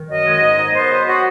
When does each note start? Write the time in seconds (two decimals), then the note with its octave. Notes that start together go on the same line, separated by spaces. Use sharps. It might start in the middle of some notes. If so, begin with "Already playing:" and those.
Already playing: D#3
0.09 F#2 D#5
0.26 G#3
0.42 G#2
0.57 D#3
0.74 B3 C5
0.90 F#3
1.07 F#4